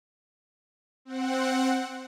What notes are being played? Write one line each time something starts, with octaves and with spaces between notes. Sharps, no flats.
C4 F#5